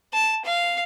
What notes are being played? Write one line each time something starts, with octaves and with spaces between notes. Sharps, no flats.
A5
F5